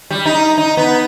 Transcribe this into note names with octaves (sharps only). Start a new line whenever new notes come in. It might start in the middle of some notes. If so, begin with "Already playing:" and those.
G3
D#4
D#4
B3